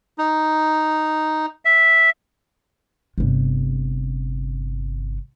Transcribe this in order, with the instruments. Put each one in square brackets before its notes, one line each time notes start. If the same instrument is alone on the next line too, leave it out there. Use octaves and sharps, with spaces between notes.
[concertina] D#4
E5
[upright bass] G1 C3